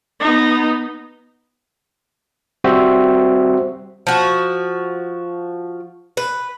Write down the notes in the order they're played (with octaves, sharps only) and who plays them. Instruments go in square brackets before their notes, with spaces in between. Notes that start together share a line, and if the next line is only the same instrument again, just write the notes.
[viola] B3 D#4
[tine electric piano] G3 C4 F#4 C5 E5
[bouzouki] F3 F#4
B4